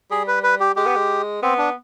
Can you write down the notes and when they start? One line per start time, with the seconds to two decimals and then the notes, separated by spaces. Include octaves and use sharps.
0.11 G3 G#4
0.28 B4
0.43 B4
0.60 G4
0.76 G#3 G4
0.86 B3
0.96 G#3
1.42 B3 C4
1.58 D4